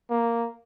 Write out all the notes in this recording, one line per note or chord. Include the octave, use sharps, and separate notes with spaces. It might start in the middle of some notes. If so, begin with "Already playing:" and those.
A#3